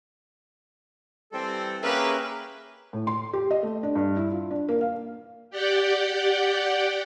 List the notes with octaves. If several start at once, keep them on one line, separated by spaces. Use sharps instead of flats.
E3 G3 C4 A4
A#3 C#4 G4 G#4 A#4 B4 E5
A2
C6
G4
D#5
A3
D4
G2
E4
F4
D4
A#3
F5
G4 D5 F#5 G5